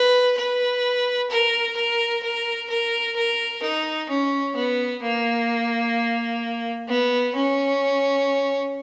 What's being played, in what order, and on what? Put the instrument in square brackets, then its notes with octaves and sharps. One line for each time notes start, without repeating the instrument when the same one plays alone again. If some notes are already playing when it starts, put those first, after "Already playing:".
Already playing: [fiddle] B4
B4
A#4
A#4
A#4
A#4
A#4
D#4
C#4
B3
A#3
B3
C#4